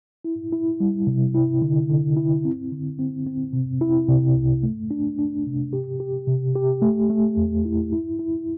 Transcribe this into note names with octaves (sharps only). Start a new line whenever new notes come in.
E4
E4
G3
C3
E4
D3
D3
E4
C4
D3
C4
C4
C3
E4
C3
C2
A3
D4
D4
C3
G4
G4
C3
G4
A3
A3
E2
E4
E4
E4